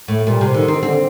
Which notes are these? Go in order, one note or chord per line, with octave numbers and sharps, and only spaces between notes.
A2 A3
A#2 G3
C3
D3 D#3
C4
D3 C4